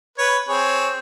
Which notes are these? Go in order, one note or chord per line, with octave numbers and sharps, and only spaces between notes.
B4 C#5
C4 G#4 C#5